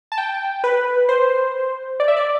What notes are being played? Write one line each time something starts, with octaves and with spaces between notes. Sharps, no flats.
A5
G5
B4
C5
D5
E5
D5